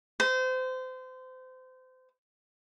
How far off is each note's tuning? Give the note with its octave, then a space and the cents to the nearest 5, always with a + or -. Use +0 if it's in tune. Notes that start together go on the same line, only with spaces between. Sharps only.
C5 -30